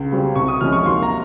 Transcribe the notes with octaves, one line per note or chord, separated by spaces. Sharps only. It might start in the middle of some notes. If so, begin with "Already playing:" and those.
Already playing: C#2
C#3 G3 C4
C2 C#6
D#6
C3 F3 G#3 C#4 F6
C#6
D#2 C6
A#5